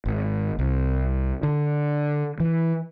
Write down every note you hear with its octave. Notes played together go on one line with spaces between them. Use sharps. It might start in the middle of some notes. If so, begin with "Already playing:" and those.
G#1
C2
D3
E3